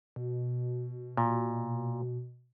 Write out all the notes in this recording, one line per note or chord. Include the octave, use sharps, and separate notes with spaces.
B2
A#2